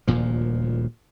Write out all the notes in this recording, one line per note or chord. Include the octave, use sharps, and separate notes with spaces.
D#1 D2 A#2 F3